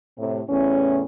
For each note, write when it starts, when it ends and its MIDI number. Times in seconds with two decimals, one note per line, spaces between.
0.19 0.42 45
0.19 0.42 48
0.49 1.03 40
0.49 1.03 45
0.49 1.03 61